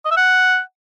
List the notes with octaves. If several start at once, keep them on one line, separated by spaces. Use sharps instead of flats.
D#5
E5
F#5